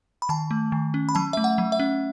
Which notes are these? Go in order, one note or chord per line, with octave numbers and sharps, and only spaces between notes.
B5
D#3 A5
A3
D#3
C#4
B5
F#3 A5
A3 E5
F#5
F#3
E5
C#4